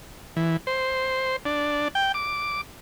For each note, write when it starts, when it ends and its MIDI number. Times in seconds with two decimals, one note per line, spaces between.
0.36 0.57 52
0.67 1.36 72
1.45 1.88 62
1.95 2.12 79
2.14 2.61 86